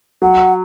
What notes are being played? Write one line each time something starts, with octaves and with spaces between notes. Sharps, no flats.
F#3 F#5